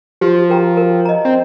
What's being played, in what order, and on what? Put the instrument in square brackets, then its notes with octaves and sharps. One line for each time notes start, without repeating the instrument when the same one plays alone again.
[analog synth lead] F3 [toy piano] G4
[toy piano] A#4 G5 A#5
A#4
D#5 A#5
[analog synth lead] C4